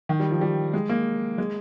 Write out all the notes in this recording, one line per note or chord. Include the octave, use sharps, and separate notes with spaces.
D#3
G3
F3
G3
G#3
A#3
G#3